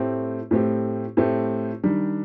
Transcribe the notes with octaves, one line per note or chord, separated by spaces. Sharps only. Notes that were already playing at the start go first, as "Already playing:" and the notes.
Already playing: A2 A3 C4 G4
A2 A3 C4 G4
A2 A3 C4 G4
D#3 G3 D4